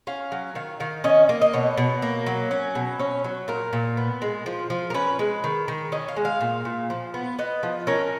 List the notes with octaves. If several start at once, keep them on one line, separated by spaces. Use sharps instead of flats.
C#4 F5
F#3
D#3 F5
D#3 F5
C#4 D#5
A#3 D#5
D#5
B2 C#5
B2
A#3
F#3
C#4
B2
C#4 C#5
F#3
A#2 A#4
A#2
B3
G#3
F3
F3
A#4
C#4 B4
G#3
D#3
D#3
C#4 D#5
F5
G#3
F5
A#2
A#2
F3
B3
B3 D#5
F3
C#4 A#4